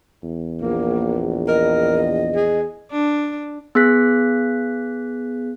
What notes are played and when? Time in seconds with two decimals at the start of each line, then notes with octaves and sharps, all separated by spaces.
0.24 E2
0.61 A#1 A#3
1.48 A#4 D#5
2.35 G#4
2.91 D4
3.75 B3 G#4 F#6 B6